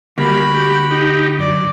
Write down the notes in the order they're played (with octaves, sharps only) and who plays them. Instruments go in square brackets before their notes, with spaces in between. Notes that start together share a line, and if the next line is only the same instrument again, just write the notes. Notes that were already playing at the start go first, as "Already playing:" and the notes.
[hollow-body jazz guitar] D2 [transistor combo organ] G3 A#3 [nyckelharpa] F#4 B5
[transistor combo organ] G4
D#4 G4
[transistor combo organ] F#2 [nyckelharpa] D5